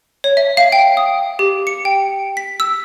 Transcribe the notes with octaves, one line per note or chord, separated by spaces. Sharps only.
C#5
E5
F5
G5
D#6
G4
C#7
G5
B6
E6